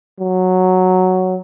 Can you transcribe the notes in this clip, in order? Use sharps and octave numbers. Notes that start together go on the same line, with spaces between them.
F#3